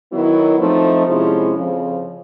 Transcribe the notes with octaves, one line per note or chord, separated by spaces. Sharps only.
D#3 F#3 B3 E4
F3 A3 C4 D#4
C3 F3 G#3 C#4 E4
F2 C#3 F3